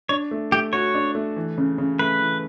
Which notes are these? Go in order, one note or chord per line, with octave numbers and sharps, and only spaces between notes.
D4 C#5
A3
A3 G4
F#4 C#5
D4
A3
E3
C#3
C#3
A3 B4
E3